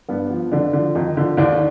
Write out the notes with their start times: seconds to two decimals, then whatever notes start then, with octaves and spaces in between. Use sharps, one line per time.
0.09 G2 B3
0.30 F3
0.51 F2 D3 D4
0.73 D3 F3
0.95 F2 D#3 D#4
1.17 D3 F3
1.37 D#2 D3 D4